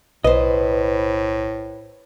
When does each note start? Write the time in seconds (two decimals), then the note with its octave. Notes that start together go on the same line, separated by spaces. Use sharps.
0.24 B1 A2 B4 C5 D#5